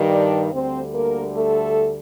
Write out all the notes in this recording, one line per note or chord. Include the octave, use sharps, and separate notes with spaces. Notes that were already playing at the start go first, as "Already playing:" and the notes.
Already playing: G2 D#3 G3
D4 D5
D2 D3 G3 C4 C5
A#3 A#4
A3 A4